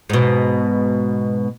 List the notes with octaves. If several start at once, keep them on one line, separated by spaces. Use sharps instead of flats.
G#2 B2